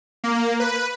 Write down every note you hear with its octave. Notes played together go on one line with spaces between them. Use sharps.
A#3
B4